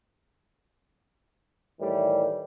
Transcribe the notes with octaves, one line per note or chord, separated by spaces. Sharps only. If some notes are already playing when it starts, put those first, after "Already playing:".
A2 D#3 E3 G3